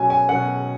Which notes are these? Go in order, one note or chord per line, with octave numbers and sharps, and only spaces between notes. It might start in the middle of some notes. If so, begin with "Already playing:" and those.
Already playing: B2 F#3 C#4 G#5
G#5
B2 F#3 C#4 F#5